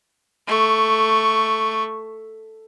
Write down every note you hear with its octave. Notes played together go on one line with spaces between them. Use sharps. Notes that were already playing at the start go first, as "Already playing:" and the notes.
A3 C#6